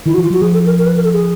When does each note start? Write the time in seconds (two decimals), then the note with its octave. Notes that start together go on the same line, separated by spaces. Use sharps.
0.06 D#3 E4
0.14 F#4
0.18 E3
0.24 F4
0.30 F#3 F#4
0.41 F3 G#4
0.54 A4
0.66 A#4
0.78 A#4
0.86 B4
0.96 A#4
1.04 A4
1.13 G#4